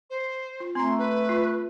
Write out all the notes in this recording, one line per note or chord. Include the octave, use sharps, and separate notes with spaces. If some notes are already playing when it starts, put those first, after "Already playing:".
C5
F4
A3 C4 A#5 C6
B4
F4